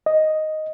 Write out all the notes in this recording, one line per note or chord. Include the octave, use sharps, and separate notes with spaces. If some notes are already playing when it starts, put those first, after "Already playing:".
D#5